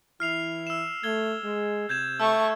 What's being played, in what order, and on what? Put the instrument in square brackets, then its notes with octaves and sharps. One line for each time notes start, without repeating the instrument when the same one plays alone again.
[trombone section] E3 E4 [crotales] F6 C7 F7
[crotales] E6 E7
[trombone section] A3 [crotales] G#6 G7
[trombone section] G#3
[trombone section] C3 [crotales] G6 G#6 E7
[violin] A3 C#6 [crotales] E6